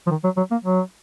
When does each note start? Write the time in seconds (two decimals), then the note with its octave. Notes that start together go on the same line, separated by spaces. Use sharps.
0.07 F3
0.11 D#3
0.24 F#3
0.37 F#3
0.51 A#3
0.64 F#3